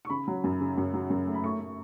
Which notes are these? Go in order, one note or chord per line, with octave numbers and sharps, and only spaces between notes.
C#6
C#3 B5
F#3
F#2
C#3
F#2
F#3
F#2
A3
B5
A3 C#6
A3